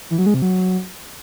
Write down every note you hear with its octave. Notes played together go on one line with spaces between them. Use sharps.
E3
F#3
G#3
C3
F#3